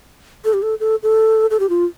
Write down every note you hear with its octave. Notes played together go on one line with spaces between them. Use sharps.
A4
G4
A4
A4
A4
A4
G4
F4